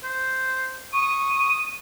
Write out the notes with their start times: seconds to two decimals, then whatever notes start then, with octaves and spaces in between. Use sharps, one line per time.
0.03 C5
0.93 C#6 D#6